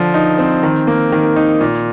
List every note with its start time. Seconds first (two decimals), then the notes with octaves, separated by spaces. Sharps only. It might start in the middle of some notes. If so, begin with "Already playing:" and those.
Already playing: D3 F3
0.14 D#4
0.38 C4
0.63 D#3
0.87 A#3
1.12 D#3
1.36 D#4
1.61 A#2